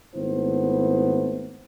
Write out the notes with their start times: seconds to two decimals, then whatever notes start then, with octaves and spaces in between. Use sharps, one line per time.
0.16 G#1 A3 B3 E4 C5